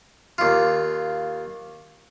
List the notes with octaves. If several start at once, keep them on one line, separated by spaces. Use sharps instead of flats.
D#2 F4